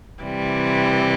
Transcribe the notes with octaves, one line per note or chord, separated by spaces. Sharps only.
C3 E3 G3